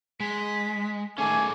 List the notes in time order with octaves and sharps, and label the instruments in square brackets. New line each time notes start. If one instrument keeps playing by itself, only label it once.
[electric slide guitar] G#3 [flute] B6
[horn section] D#3 A3 G#5 [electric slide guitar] C#4 G#4 A4 [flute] D6